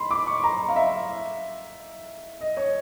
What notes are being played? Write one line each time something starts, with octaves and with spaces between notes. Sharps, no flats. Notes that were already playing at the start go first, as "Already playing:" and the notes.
Already playing: B5 C6
D6
C#6
A#5
F5
E5
D#5
C#5